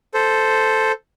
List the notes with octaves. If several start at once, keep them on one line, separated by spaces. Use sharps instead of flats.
A4 C5